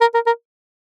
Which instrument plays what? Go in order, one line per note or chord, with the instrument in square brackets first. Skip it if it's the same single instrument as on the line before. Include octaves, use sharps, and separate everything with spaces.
[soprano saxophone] A#4
A#4
A#4